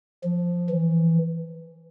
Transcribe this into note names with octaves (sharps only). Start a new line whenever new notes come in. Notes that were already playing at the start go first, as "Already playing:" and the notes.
F3
E3